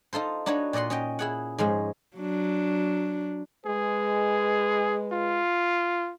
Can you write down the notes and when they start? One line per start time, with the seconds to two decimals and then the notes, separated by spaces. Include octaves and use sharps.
0.13 D#4 F4 A4 C5
0.46 D4 D#4 F#4 B4 C#5
0.73 A#2 D5 D#5 F#5 C6
0.90 C#4 D#5 G5
1.19 E4 G#4 F#5
1.58 G#2 F3 G#3 C#4
2.16 F#3 D4
3.66 G#3 G#4 B4
5.13 F4